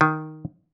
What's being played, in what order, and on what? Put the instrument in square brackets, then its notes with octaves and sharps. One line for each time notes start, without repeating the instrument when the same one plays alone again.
[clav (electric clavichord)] D#3